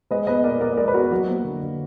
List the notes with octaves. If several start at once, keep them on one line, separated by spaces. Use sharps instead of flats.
G#3 B4 D#5
B3 B4 D#5
A#2 A#4 D5
A#2 A#4 D5
D#5
G#3 A#4 D5
B4
B3 F#4 A#4
F#3 F#4
A#3
D3
D3